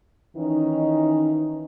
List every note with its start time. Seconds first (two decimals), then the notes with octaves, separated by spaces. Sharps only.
0.37 D#3 E3 C#4 D#4